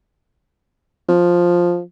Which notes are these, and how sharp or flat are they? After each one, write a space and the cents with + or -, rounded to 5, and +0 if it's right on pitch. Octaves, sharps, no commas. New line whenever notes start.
F3 +5